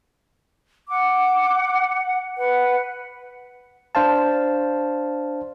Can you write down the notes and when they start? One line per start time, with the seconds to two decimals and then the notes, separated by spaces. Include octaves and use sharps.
0.88 F#5 D6
2.38 B4 F#5
3.95 D4 C5 F5 A5